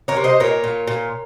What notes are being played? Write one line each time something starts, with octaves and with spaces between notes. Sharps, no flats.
A#4 C#5
C3
C5 D#5
A#2 A#4 C#5
A#2
A#2